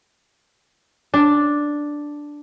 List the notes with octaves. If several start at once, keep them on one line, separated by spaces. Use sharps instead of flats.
D4